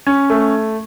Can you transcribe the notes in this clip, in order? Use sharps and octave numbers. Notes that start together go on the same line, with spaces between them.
C#4
A3